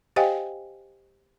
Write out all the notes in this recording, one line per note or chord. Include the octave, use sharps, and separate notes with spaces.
G4 C5 D#5 F5 G5 G#5